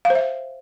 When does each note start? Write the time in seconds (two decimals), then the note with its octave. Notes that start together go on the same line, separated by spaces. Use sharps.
0.05 F5
0.10 C5
0.15 E5